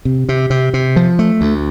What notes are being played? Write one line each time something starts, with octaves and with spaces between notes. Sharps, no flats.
C3
C3
C3
C3
F3
A3
D2